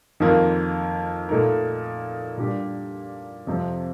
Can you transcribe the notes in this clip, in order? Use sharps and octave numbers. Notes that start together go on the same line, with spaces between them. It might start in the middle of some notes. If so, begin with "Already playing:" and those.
F2 D#3 A#3 F4 A#4
A#2 A3 D#4 A#4
A#2 G3 D4 G4
F2 C3 F3 C4